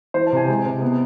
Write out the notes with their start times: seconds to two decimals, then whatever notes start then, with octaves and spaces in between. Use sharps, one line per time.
0.14 E3 C5
0.26 A5
0.32 C3 G#5
0.48 G#3
0.65 C3
0.82 B3